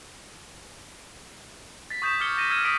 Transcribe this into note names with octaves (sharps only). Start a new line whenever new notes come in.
A6 B6
C#6 D#6 G6 A6 B6 E7
D6 F6 G#6 A6 C#7 G7
A6 A#6 D#7 E7
E6 F6 G#6 B6 D#7 E7
D#6 B6 D7